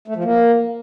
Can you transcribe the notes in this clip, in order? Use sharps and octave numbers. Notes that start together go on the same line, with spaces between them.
A3
F3
A#3